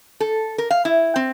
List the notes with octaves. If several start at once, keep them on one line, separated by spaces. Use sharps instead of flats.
A4
A#4
F5
E4
C4